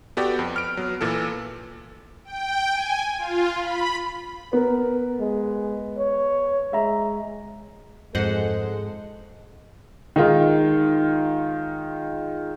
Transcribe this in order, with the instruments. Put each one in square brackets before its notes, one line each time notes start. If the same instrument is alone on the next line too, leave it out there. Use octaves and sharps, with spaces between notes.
[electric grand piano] B3 F#4 G4 A4 D5 G5
F2
F6 D7
F#3 B3
A#2 E3 A4
[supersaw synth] G5
G#5
F4
B5
[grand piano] B3 [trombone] A#4
[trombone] G#3
C#5
[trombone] G#3 [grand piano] E5 A#5
[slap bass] F2 [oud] G#2 D#5 [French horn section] G#3 A4 [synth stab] C5 F#5
[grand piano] D#3 G#3 D#4 F4